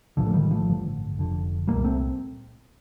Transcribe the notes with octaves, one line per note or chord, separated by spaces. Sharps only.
A1 A2 D3 F3
A3
D#3 G3
F3 A3
A1 G2 D3
F1 F2 D3
C2 A#2 G3 A#3
A3 C4